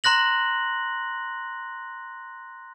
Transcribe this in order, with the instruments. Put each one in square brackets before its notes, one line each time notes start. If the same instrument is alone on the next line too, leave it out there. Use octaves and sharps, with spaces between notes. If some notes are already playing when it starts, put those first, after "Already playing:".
[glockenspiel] A#5 C6 F#6 A#6 F#7